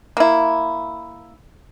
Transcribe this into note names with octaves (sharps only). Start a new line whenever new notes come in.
A#3 E4